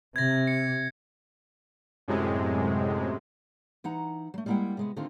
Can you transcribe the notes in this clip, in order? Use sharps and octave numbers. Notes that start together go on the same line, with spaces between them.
C3 G#6 A#6
C#7
F#2 A2 C3 G#3
E3 D#4 F#5 A#5
F#3 A3
G3 G#3 A#3 E4 F#5 G5
C3 G#3 B3
D3 D#3 A3 C4 F4